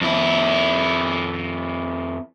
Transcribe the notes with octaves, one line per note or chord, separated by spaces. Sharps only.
F2 E4